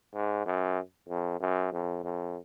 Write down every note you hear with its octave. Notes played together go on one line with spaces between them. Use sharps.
G#2
F#2
F2
F#2
F2
F2